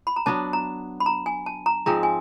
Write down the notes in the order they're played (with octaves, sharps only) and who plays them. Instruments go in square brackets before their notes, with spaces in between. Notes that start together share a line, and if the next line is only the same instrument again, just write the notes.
[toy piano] B5
A#5
[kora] F#3 B3 D4 [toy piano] A5
[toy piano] A#5
B5
A#5
G#5
A5
A#5
[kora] G#2 F3 G#3 C4 [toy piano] A#5
[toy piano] G#5